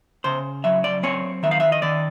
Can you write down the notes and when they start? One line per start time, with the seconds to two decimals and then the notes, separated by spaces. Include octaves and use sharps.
0.24 C#3 C5
0.64 F#3 E5
0.84 D5
1.03 C4 C#5
1.43 D#3 E5
1.51 F5
1.60 E5
1.72 D#5
1.82 D#3 D5